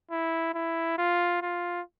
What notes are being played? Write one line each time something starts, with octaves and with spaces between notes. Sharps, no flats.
E4
E4
F4
F4